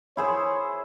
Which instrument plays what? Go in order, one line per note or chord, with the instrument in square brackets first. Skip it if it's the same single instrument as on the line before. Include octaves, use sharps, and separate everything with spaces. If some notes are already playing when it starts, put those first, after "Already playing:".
[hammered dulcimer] E4 G#4 C5 [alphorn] C#5